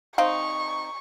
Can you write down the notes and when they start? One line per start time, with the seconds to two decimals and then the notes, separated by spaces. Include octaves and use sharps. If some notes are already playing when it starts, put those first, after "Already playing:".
0.18 C4 D#4 F5 C#6